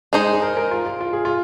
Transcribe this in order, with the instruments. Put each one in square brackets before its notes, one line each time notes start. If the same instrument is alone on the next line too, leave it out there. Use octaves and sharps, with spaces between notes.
[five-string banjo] G#3 D#4 C5 D#5 [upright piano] G#4
[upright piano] G#4
A#4
A#4
F4
F4
F4
G#4
F4